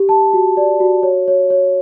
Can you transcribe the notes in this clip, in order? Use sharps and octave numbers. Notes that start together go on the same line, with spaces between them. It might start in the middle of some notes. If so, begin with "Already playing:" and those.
Already playing: G4
A5
F#4
D5
F#4
C#5
C#5
C#5